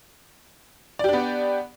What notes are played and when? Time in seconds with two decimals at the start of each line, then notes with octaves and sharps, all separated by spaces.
0.99 D5
1.04 G4
1.09 D4
1.13 B3